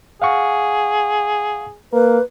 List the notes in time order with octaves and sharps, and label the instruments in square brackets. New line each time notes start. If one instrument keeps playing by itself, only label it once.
[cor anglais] G#4 [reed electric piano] F5 F#5 C#6
[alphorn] A#3 [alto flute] B4